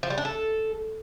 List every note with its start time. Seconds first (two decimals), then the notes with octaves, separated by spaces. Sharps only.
0.03 F3
0.10 G3
0.18 D4
0.25 A4